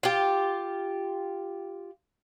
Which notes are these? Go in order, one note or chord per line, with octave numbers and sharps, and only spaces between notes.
F4 G4